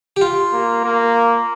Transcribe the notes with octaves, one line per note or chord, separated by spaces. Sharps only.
G4
F4
A#3
A#3